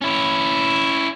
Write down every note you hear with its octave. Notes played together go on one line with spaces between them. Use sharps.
C#4 E4